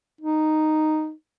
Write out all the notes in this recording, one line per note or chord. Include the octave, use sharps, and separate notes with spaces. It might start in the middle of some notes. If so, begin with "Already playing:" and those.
D#4